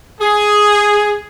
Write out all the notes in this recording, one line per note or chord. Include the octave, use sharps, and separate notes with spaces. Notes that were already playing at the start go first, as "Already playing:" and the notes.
G#4